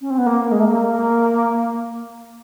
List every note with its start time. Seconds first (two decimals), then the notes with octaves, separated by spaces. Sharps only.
0.01 C#4
0.10 C4
0.18 B3
0.26 A#3
0.51 G#3
0.60 A3
0.66 A#3